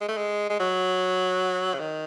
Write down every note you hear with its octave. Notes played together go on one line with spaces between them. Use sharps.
G#3
A3
G#3
G#3
F#3
C#3
D#3